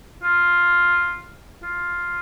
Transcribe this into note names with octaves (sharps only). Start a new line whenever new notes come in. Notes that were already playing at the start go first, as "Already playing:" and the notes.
F4
F4